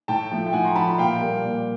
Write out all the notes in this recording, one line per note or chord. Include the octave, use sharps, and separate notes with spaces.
A2 G5 A5
F3 A3
G5
A2 F#5 G#5
A#5 C6
F3 A3 A5 B5
A#2 F5 G5
G3 A#3
A#2